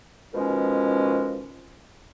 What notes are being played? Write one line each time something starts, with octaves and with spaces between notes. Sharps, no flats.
B2 D#3 F3 G#3 C#4